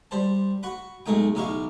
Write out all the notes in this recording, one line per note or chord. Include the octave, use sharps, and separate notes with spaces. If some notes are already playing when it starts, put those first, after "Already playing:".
G3 C5 A5
F#4 F#5 B5
B1 G#3 A3 D#4 G5
B1 D#4 E4 G4 F5 C#6